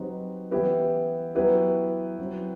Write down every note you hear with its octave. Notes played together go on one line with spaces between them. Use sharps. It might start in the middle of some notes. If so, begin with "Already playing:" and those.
Already playing: F#3 C4 D#4 G4 B4
E3 B3 E4 G4 B4
F#3 B3 E4 G4 B4
F#3 C4 E4